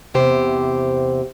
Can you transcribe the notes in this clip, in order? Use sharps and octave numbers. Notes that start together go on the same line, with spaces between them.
E2 C3 G4 C5